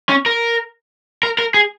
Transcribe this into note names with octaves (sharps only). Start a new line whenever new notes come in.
C#4
A#4
A#4
A#4
G#4